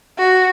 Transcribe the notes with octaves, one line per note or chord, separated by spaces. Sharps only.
F#4